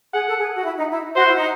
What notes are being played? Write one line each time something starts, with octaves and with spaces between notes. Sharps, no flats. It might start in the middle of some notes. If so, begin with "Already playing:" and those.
G#4 F#5
A4
G#4
F#4
E4
D#4
E4
F#4 C5
E4
D#4